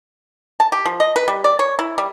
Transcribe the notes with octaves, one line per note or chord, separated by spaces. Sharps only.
A5
G4
F3
D#5
B4
G3
D5
C#5
E4
G3